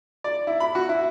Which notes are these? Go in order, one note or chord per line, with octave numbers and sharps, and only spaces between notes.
D5
E4
B5
F#4
E4